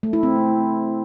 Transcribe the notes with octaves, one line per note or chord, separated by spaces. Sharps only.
A3
E4
C4